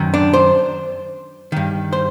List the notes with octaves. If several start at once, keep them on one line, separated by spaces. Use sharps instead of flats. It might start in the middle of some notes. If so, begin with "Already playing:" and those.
Already playing: F#2 D#3
D4
C5
G2 D#3
C5